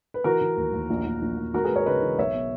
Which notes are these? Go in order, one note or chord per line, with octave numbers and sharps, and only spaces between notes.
B4
E3 F#4 A#4
E3
D#2
D#2
A#1
A#1
A#1
A#1
G#1 F#4 A#4
G#4 B4
G#1
A#4 C#5
C#3 B4 D#5
E3
B1 C#5 E5
B2